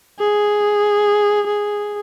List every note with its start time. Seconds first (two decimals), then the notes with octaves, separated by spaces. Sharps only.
0.19 G#4
1.47 G#4